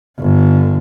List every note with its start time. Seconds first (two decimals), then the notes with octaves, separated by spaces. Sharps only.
0.19 G1 D3